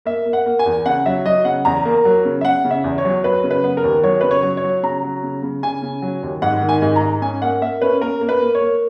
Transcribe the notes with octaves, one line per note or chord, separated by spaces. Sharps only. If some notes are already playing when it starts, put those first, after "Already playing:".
A#3 E5
A#3
F#5
A#3
G#5
E2
C#3 F#5
F#3 E5
F#3 D#5
C#3 F#5
E2 A#5
A#3
F#3
C#3
E5
C#3 F#5
C#3
E5
E2
C#5
F#3
F#3 B4
C#3
B4
B3
A#4
D#2
F#3 C#5
C#3 B4
C#5
F#3
C#5
F#3
C#3 A#5
F#3
C#3
C#3
C#3 G#5
C#3
F#3
D#2
G#2 F#5
D#3
G#5
G#2
A#5
G#2
C#4 G#5
A#3 F#5
A#3 E5
C#4 B4
A#3 A#4
A#3
B4
A#3
C#5
A#3